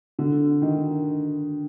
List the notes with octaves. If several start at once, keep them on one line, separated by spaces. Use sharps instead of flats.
D3
D#3